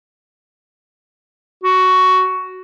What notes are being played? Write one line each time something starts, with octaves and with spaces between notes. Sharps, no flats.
F#4